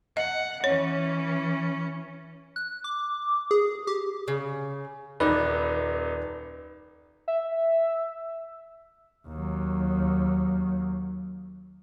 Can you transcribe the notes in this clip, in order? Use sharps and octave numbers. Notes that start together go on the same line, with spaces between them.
D#5 F#5
E3 C#4 C#5
F#6
D6
G#4
G4
C#3
D#1 D#4 B4 D5
E5
D#2 F#3